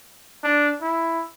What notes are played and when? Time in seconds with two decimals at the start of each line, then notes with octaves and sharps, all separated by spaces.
0.44 D4
0.82 E4